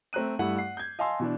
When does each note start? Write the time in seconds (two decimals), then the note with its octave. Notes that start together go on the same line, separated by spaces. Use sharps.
0.13 A3 C4 A#5 F#6 D#7
0.39 G2 A3 E4 F#5
0.57 F#5 C7
0.77 G6 G#6
0.99 D#5 F5 G#5 A5 C6 E6
1.20 B2 E3 D4